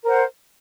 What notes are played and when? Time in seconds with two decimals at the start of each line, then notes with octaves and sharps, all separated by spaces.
0.01 A#4
0.05 C5
0.08 F#5